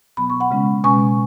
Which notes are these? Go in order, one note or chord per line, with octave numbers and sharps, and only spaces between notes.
B2 F#3 B3 B5
C#6
F#5 B5
C#3 G#3 C#4
B2 G#3 C#4 G#5 C#6